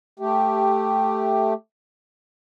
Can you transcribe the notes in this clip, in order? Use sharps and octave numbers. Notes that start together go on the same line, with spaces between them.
A3 G4